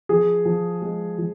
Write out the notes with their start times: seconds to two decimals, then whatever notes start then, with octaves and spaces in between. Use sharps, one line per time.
0.09 F3 G#4
0.45 F3
0.82 G#3
1.18 F3